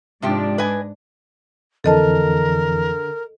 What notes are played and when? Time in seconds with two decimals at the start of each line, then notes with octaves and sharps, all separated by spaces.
0.22 G#2 C3 F3 D4 G4
0.58 B4 D#5 G#5
1.84 F2 D3 E3 A4 A#4 D#5 A5